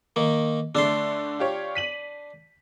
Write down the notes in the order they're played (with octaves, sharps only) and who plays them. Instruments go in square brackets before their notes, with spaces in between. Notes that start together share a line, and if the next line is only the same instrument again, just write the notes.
[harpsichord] D#3 A#3
[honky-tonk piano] D3 A3 [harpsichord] D4 A5 C6
[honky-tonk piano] F4 G4 C#5
B6 D#7 F#7